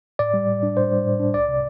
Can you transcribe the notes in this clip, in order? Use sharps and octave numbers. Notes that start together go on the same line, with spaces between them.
A2 D5
G3
A2
D4
A2 C5
G3
A2
D4
C2 D5
C3